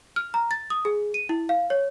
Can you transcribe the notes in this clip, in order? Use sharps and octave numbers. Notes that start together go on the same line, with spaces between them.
F6
A#5
A6
D#6
G#4
D#7
E4
F5
C#5